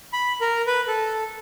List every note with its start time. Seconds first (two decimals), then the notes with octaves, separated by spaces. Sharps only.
0.13 B5
0.41 A#4
0.67 B4
0.88 A4